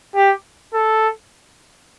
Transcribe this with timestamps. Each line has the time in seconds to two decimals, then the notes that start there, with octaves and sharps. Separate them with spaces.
0.16 G4
0.74 A4